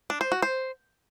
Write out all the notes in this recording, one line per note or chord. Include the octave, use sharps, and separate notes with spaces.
D4
C5
F#4
C5